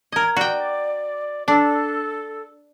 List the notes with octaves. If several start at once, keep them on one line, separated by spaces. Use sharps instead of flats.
A#4 D#5 G#6
F#4 D5 G5
D4 A4